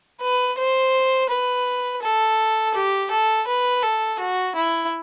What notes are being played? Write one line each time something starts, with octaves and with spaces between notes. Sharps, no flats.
B4
C5
B4
A4
G4
A4
B4
A4
F#4
E4